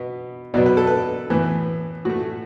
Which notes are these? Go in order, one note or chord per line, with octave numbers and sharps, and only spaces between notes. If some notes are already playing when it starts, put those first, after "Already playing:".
Already playing: B2 B3
B2 F#3 B3 D5
B4
A4
B4
A2 E3 B3
A2 A3 F#4